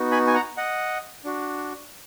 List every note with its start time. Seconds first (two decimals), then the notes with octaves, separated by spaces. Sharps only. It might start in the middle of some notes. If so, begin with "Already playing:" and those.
Already playing: B3 D#4 F#4
0.12 G#5 B5
0.27 G#5
0.34 F#5 A#5
0.57 D#5 F#5
1.24 D4 F#4